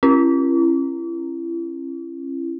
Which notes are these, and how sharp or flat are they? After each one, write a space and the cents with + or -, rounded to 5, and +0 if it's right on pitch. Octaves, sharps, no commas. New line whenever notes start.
C#4 -30 E4 +35